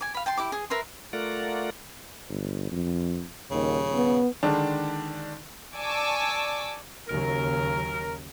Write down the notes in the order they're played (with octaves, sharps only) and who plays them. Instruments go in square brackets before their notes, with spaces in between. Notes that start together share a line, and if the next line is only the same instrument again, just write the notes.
[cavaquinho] G#5 D6
F5 B5
G5 A5 C6
E4 G4 D6
G#4
A#4 B4 E5 C6
[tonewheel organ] A3 F4 A#4 D5 F#5
[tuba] G1
F2
[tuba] D#1 [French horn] D#2 [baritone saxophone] C#3
[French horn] B3
[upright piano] D3 D#3 G#3 D4
[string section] D5 G#5 A5 C#6 D6 E6
[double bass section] D#2 C#3 F#3 [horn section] A#4